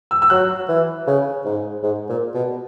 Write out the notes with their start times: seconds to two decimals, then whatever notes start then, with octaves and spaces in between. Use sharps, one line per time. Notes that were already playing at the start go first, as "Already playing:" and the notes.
0.11 E6
0.22 E6
0.30 F#3 F#6
0.68 E3
1.07 C#3
1.45 G#2
1.83 G#2
2.09 A#2
2.34 B2